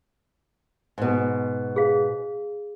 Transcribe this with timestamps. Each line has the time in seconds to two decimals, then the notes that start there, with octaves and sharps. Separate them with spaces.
0.98 G#2 B2
1.76 G#4 F5